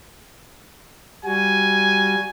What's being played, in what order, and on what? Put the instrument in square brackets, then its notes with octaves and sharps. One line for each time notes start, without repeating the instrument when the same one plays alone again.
[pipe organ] G3 F#4 [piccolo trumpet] G#5